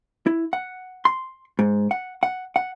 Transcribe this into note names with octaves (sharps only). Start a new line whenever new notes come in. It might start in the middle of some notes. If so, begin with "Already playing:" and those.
E4
F#5
C6
G#2
F#5
F#5
F#5